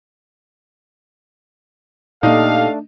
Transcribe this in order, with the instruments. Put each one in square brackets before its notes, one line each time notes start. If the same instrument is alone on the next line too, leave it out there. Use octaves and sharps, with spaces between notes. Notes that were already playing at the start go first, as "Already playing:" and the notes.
[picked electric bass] A#2 A#3 [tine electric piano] A3 D4 [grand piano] D#4 [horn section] G4 A4 F5